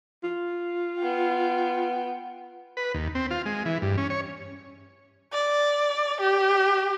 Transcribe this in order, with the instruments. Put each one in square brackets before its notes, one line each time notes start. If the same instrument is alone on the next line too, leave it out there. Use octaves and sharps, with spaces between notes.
[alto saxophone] F4
[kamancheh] B3 G5
[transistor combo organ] B4
D#2
C4
F4
G#3
E3
G2
C#4
C#5
[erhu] D5
G4